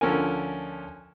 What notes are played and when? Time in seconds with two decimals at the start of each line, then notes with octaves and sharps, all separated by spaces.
0.01 D2 F3 C#4 A4 A#4 G#5